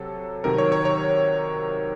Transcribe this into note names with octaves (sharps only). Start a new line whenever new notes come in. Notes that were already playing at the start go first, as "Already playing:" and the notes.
Already playing: C3 F#3 A4
C3 D#3 F#3 A#4
C#5
C#5
C#5